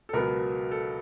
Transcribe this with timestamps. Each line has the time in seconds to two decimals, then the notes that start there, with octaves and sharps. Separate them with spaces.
0.09 A4
0.13 C#2 B2 F#3 B3 A#4
0.71 A4